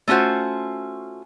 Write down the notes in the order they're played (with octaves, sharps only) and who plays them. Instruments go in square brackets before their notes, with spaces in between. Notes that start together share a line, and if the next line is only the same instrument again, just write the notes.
[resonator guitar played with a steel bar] A3 C#4 F4 F#4 C5